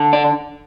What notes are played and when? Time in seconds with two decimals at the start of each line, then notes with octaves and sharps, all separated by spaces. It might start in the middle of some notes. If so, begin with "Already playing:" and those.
Already playing: D3
0.13 D5